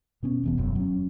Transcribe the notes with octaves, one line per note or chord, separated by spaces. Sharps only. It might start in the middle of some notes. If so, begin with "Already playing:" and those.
B2 B3 C#4
E1 E2 B2
E1 F#2
F#3 C#4